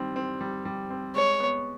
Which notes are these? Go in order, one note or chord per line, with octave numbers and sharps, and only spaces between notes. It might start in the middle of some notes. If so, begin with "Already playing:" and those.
Already playing: D#3 G3 C4
C4
G3
G3
C4
G#3 C#5
B3